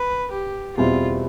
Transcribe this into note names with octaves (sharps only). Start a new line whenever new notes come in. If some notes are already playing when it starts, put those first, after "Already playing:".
Already playing: B4
G4
E2 B2 G3 C4 E4 F4